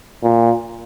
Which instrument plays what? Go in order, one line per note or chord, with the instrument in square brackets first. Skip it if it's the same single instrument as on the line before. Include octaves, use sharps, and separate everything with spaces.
[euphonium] A#2